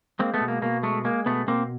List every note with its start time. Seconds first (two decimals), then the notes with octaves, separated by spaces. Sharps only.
0.19 G#3 A#3 C4
0.34 A3 B3
0.41 B2
0.48 A#3
0.62 B2 A#3
0.83 G#3 A3
1.05 G#3 A#3
1.26 B2 A3 B3
1.47 B2 A#3 C4